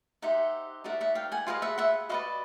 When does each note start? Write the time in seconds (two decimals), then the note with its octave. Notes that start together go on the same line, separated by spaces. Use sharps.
0.22 D#4 G4 C5 E5 F#5
0.84 D#4 F#4 A#4 D5 E5 F#5
1.01 E5 F#5
1.15 F5 G5
1.32 F#5 G#5
1.47 F4 G#4 B4 D#5 F5 G5
1.62 E5 F#5
1.78 E5 F#5
2.09 F#4 B4 D5 D#5 F5